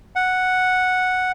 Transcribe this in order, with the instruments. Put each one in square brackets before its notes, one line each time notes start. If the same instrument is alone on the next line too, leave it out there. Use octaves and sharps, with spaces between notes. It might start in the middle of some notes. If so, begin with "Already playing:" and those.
[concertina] F#5